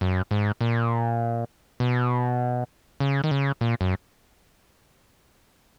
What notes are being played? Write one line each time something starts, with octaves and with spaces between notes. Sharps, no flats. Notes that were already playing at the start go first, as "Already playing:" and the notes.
F#2
G#2
A#2
B2
C#3
D#3
C#3
A#2
F#2